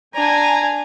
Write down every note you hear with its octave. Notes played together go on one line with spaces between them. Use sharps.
D4 G#5 A#5